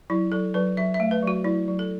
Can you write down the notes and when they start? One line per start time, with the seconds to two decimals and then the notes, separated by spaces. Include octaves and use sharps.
0.10 F#3 E4
0.32 F#3 A4
0.54 F#3 B4
0.77 F#3 E5
0.94 E5
1.00 A3
1.11 B4
1.23 F#3 F#4
1.44 F#3 E4
1.68 F#3
1.79 A4